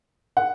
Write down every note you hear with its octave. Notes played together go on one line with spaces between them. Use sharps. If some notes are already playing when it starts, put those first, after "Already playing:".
F#5